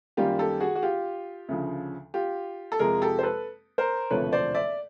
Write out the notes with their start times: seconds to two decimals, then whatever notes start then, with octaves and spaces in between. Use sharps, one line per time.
0.17 F#2 D#3 G3 A#3 F4 G4
0.39 G4 A4
0.60 F#4 G#4
0.75 F#4
0.83 F4 G4
1.48 D2 C#3 F3
2.14 F4 G4
2.72 A4
2.79 F2 C3 F3 G#3 G#4 A#4
3.01 G4 A4
3.19 C5
3.23 A4 B4
3.78 A#4 C5
4.11 E1 D2 C3 F3 A3 B4 C#5
4.33 C5 D5
4.54 D5 E5